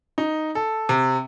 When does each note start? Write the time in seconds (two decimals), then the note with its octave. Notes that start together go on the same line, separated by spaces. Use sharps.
0.18 D#4
0.55 A4
0.89 C3